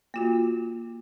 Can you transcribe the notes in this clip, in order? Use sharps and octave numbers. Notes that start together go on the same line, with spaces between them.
A#3 F4 F#4